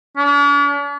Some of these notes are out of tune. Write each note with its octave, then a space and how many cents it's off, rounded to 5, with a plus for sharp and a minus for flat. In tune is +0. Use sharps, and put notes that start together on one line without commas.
D4 -45